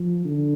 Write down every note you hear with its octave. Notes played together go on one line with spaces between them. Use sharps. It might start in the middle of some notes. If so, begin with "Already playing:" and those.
Already playing: F3
D3